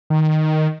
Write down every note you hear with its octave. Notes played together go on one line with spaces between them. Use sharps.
D#3